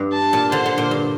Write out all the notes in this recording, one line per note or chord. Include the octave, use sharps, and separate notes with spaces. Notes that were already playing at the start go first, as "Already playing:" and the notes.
Already playing: G2
A5
A#2
D3 C5
D3
A#2
G2